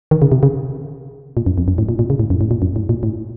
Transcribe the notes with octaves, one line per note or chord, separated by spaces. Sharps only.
D#3
C#3
C3
C#3
A#2
F#2
F2
F#2
A2
A#2
A#2
C#3
A2
F#2
A2
A#2
F#2
A2
A#2
A2